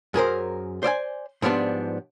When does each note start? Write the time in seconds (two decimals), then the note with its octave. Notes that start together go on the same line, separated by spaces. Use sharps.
0.14 F#2 G#4 A#4 C5
0.83 C5 D5 E5 G#5
1.42 G#2 F3 G3 B3 D4